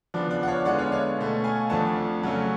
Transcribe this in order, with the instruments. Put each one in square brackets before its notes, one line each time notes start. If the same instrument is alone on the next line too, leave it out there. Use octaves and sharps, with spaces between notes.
[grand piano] C#3 F3 B3 D4 D5
D5
F#5
C#5 F5
D3 G#3 B3 D4 D5 F#5
C#5 F5
C#5 F5
B2 A3 C#4
F5 G#5
F2 F3 A3 D4 F#5 A5
C#3 F#3 A3 C#4